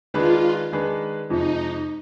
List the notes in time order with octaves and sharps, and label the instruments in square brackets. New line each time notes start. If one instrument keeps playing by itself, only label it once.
[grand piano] D#3 G#3 D4 G#4 B4 [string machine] F4
[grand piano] D#3 G#3 D4 G#4 B4
[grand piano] F2 C3 F3 G#3 [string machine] D#4